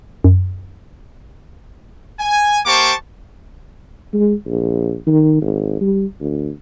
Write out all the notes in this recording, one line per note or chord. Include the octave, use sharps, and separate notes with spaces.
F#2
G#5
A#3 G4 C5 A5 C#6 D6
G#3
A#1
D#3
G#1
G3
D2